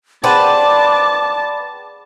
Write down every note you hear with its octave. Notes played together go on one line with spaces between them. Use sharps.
G#4 B4 C5 D5 F#5 G5 A5 D6